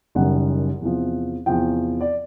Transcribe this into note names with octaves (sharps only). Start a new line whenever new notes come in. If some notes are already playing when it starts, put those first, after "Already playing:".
F#1 F#2 D#3 G3 F#5
E2 C3 F3
E2 C3 F3 G5
D5